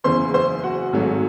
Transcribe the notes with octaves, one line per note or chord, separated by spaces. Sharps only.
F#1 E2 C#3 C5 C6
C5 C6
F#4 F#5
G#1 G#2 F#3 A3